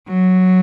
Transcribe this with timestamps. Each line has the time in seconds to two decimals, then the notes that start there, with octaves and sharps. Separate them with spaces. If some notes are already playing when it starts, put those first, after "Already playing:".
0.08 F#3